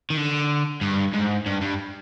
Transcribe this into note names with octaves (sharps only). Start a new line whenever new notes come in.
D#3
D3
G2
G#2
G2
G2